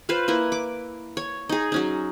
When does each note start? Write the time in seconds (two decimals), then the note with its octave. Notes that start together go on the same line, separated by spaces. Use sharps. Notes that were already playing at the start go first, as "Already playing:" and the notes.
0.09 F4 B4 C5 F5
0.28 A#3 E4 B4
0.52 D6
1.17 C#5
1.49 D#4 G#4
1.72 F#3 C#4 D#4